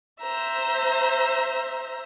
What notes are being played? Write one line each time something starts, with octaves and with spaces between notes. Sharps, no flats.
C5 E5 A#5